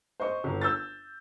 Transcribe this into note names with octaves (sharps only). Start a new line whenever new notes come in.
C5 D#5 C#6
G1
E6 G6 A6